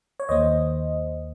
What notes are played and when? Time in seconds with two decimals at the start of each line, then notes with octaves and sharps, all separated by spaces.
0.20 C#5
0.29 D#2 D#3 A#3 C5 D#5